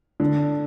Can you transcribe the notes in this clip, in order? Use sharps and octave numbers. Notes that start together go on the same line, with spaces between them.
D3